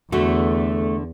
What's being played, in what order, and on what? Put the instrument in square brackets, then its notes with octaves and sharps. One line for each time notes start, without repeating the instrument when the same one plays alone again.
[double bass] E2 [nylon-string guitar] D3 F#4 [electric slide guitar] A3